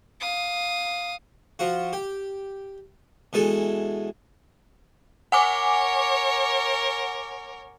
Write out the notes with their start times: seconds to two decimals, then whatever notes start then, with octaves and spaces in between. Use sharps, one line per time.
0.21 F5 D#6
1.59 F3 F4 F#4
1.93 G4
3.33 B2 E3 G#3 A4
5.32 A#4 C#5 F#5 G#5 D6